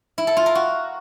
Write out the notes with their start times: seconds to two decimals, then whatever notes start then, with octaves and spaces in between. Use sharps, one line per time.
0.18 E4
0.27 A4
0.37 F4
0.46 A#4
0.55 F#4